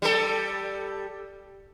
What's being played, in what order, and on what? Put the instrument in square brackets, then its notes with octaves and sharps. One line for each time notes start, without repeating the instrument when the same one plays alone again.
[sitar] G3 A4